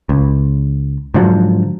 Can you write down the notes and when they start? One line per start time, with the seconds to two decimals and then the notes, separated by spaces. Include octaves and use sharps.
0.09 C#2
1.14 G#2 D3 F3 F#3